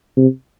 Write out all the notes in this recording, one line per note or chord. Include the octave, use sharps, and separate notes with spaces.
C3